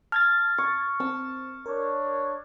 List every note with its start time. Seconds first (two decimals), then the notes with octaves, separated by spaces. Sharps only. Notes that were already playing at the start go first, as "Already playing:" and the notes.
0.12 A5 F6 G#6 A6
0.58 C#6
1.00 C4 A5
1.66 D4 A#4 C#5